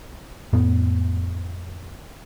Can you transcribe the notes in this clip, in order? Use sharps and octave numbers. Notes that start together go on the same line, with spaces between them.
F2 A2 B3